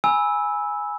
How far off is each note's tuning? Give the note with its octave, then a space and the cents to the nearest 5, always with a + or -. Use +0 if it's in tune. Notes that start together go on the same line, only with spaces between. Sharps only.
G#5 +0 B5 -10 E6 -10